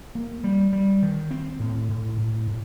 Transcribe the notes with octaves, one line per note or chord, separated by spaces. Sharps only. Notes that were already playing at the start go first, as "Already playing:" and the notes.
A#3
G3
G3
D#3
C4
A2
A2
A2
A2